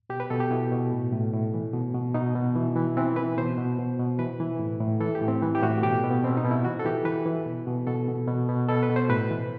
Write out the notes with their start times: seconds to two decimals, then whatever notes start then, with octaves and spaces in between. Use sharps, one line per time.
0.09 B2 G4
0.20 B4
0.30 B2 A4
0.40 G4
0.51 B2 E4
0.72 B2
0.92 A2
1.13 A2
1.33 A2
1.54 E3
1.73 B2
1.94 B2
2.14 B2 D#4
2.35 B2
2.56 E3
2.76 E3
2.97 E3 C4
3.16 E3 B4
3.38 B2 C5
3.58 B2
3.79 B2
3.99 B2
4.19 E3 B4
4.40 E3
4.59 A2
4.80 A2
5.00 E3 A4
5.15 G4
5.22 A2
5.28 C4
5.42 E3
5.55 G4
5.62 A2 F#4
5.83 B2 G4
6.04 B2
6.11 B3
6.24 B2 C4
6.37 D#4
6.44 B2
6.51 E4
6.65 E3 F#4
6.79 A4
6.86 E3 G4
7.05 E3 B4
7.25 E3
7.46 B2
7.67 B2
7.87 B2 A4
8.08 B2
8.28 B2
8.48 B2
8.69 B2 A4
8.83 B4
8.90 B2
8.96 C5
9.09 A2 B4
9.30 E3